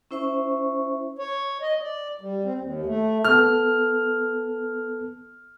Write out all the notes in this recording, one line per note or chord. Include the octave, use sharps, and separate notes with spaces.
C#4 E4 C5 E5 C#6
C#5
D#5
D5
G3
C4
D#2
A3
B3 A4 F6